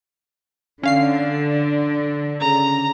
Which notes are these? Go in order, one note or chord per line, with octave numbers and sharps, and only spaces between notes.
D3 C#4 D4 F5 C7
C#3 A#5